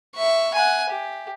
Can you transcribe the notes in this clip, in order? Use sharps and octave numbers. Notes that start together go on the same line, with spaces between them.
E5 C#6
F#5 G#5
G4